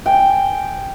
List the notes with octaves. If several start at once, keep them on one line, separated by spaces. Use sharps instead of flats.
G5 G#5